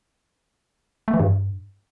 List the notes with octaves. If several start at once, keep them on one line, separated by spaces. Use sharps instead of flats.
A3
E3
G2